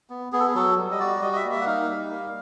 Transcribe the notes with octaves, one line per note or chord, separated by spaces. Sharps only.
B3
B3 G#4
A4
G#4
F#3 A4
G3
D#5
F#4 D5
G3 D#5
D#5
E5
A#3
E5
F#5
D#4 F5
G3
A#3